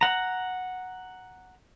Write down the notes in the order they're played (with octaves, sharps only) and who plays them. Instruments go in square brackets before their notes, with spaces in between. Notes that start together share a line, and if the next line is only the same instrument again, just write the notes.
[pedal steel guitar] F#5 A#5